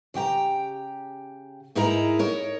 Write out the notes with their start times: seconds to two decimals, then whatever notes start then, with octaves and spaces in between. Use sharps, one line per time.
0.14 C#3 G4 G5 A#5
1.75 G#2 D#4 E4 G#4 A#4 A#5
2.19 D#4 A#4 C#5